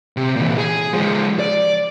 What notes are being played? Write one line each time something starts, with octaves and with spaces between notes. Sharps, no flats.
C3
A#2 E3
G#4
F3 G#3
D5